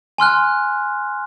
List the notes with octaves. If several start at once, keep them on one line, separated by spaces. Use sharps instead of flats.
G#5 C6 F6 F#6